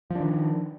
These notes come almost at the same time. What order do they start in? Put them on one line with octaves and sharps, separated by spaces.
F3 D4 D#3